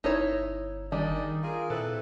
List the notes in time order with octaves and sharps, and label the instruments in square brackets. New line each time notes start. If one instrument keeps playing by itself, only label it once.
[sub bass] G1 [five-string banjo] D#4 E4 C#5
[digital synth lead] D#3 [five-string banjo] G3 D4 [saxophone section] G#4 D#5
[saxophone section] F4 G#4 A#4
[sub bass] A#2 [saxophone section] C4 E4 B4 [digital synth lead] A4